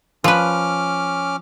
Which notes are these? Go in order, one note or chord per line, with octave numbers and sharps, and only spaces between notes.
F3 C#4 B4 D6 F6